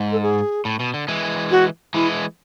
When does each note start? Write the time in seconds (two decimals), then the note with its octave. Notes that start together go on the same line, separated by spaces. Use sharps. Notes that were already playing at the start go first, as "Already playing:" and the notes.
Already playing: G#2
0.12 A4
0.23 G#4
0.65 A2
0.80 B2
0.94 D3
1.08 E3 G#3
1.51 F#4
1.94 E3 G#3 E4